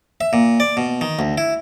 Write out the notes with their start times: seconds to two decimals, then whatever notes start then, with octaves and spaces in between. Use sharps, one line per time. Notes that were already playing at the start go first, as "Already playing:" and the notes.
0.21 E5
0.33 A#2
0.60 D5
0.77 B2
1.01 D#3
1.19 D2
1.38 E4